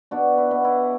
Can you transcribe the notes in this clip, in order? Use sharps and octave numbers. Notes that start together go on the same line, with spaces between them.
B2 D4 F#4
E4
B2
E4